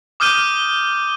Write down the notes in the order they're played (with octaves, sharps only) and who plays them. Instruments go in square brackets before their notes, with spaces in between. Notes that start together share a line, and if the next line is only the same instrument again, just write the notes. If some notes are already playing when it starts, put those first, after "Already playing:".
[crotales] D6 D#6 F6 G6 D#7 G7